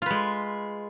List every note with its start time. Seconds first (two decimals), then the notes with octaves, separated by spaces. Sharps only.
0.02 F4
0.06 B4
0.10 G#3